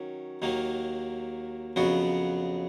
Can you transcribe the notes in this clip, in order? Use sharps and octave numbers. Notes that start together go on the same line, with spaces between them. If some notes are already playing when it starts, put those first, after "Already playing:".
Already playing: D#3 F#3 C#4
D#2 D#3 F#3 A#3
F2 C#3 F#3 B3 F#4